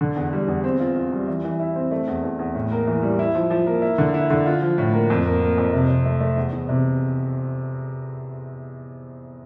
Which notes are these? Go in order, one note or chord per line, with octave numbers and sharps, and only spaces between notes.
D3
E2
G3
E2
C4
F4
F4
G3
E3
E3
E4
C4
A3
E2
E2
E2
A2
A#3
E3
G3
E4
F3
F3
A#3
E4
D3
E4
D3
F4
F3
A2
A#3
F2
A#3
A#3
F2
C3
C3
A3
A3
E2
E2
C3